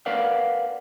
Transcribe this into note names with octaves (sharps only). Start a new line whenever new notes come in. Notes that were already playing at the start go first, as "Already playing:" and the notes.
A#4 B4 D5 F5 F#5